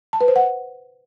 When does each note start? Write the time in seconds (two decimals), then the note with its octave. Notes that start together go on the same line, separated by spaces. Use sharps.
0.13 A5
0.21 B4
0.28 C5
0.36 F#5